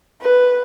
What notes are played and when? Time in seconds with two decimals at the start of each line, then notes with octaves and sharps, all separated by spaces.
0.21 B4